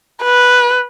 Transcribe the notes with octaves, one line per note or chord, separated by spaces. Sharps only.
B4